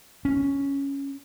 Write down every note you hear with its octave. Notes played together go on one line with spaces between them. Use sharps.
C#4